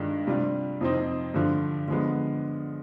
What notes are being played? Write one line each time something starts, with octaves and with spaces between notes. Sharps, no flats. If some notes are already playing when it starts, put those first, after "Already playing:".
Already playing: G2 D#3 G#3 D4 F4
C3 G3 D4 F4
F2 C3 F3 C4 D#4
G2 D3 F3
D3 F3 G#3 B3